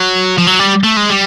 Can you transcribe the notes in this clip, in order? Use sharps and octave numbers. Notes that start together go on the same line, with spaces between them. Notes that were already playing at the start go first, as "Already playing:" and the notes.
Already playing: F#3
F3
F#3
G3
A3
G#3
G3